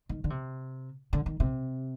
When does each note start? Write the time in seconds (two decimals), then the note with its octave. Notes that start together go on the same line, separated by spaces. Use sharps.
0.09 D#3
0.24 D3
0.30 C3
1.13 D3
1.26 D#3
1.40 C3